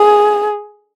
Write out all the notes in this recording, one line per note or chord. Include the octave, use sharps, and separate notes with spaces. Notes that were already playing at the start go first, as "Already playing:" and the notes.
Already playing: G#4